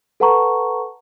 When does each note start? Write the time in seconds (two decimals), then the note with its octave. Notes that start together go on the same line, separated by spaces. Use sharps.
0.20 A4 B4 F#5 A5 A#5 C#6